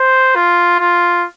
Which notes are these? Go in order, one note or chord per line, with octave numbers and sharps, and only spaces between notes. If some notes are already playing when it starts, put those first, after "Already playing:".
Already playing: C5
F4
F4